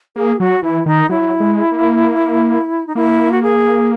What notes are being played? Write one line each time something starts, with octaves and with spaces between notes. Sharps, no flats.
A#3 G#4
F#3 F#4
E3 E4
D#3 D#4
F#3 E4
G#3
A#3
D#4
A#3 E4
F#4
G#4